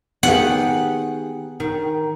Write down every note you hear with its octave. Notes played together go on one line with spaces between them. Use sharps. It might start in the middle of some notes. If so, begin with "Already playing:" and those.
D#3 B3 G4 G#4 F5 F#5
D#3